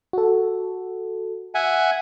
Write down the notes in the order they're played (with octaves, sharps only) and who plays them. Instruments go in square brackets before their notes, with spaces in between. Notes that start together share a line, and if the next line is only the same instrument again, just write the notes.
[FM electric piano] F#4 A4
[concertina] E5 F#5 G#5